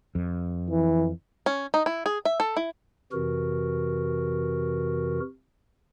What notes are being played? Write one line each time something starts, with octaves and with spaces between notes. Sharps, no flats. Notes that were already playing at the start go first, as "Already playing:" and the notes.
F2
E3
C#4
D#4
E4
G#4
E5
A4
E4
F2 C3 E3 F#4 A#4